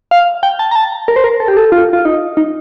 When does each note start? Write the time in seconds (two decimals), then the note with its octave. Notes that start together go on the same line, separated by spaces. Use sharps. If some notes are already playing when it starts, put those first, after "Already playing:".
0.11 F5
0.43 G5
0.59 A5
0.71 A#5
0.76 A5
1.08 A#4
1.16 C5
1.24 A#4
1.40 A4
1.48 G4
1.57 A4
1.72 F4
1.93 F4
2.05 D#4
2.37 D#4